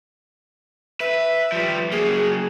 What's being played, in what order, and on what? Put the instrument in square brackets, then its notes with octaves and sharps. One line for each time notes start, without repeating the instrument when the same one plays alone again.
[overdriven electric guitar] B4 [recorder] E5
[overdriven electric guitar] F3 G3
[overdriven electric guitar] F#3 A#3 [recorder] G#4